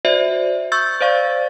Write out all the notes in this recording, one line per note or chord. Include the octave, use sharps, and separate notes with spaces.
F#4 C5 D5 E5
C#6 E6 G6 A6
C5 D5 F5 C#6 A6